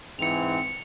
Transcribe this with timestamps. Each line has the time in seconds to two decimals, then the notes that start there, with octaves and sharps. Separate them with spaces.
0.19 G#2 E3 C4 C#7 F7